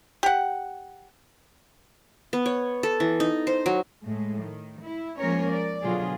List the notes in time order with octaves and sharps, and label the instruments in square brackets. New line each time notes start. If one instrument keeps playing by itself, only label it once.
[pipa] G4 F#5
[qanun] B3
C#5
A4
E3
D#4
C5
F#3
[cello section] A2 G#3
D#3
E4
F3 G#3 A#3 C#4 A#4 C#5
D5
B2 D3 F#3 F4 G#4